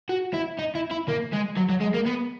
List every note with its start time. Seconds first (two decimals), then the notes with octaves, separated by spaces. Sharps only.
0.09 F#4
0.34 E4
0.59 D#4
0.75 E4
0.91 E4
1.08 A#3
1.32 G#3
1.57 F#3
1.69 F#3
1.81 G#3
1.94 A#3
2.06 B3